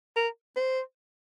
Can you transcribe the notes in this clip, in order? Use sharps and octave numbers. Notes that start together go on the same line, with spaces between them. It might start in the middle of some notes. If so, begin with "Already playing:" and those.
A#4
C5